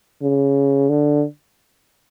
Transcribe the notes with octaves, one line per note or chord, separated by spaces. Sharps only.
C#3
D3